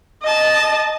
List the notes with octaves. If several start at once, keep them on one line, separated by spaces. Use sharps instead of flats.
D#5 A5